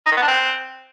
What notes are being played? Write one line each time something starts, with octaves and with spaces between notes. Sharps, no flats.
D#4
D#3
B3
D4
C4